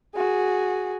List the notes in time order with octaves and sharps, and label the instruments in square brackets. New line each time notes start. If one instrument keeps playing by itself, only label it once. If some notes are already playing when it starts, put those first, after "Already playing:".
[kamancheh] F#4 G#4